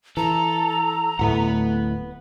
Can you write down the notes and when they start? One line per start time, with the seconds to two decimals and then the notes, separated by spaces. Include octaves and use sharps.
0.17 E3 A4 A#5
1.19 D1 A2 A3 B4 F#5